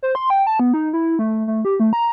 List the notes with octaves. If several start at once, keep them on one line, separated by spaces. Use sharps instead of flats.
C5
C6
G5
A5
B3
D#4
E4
A3
A3
G4
A3
A#5